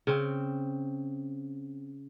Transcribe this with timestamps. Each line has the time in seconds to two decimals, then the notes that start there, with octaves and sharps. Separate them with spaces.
0.07 C#3 C4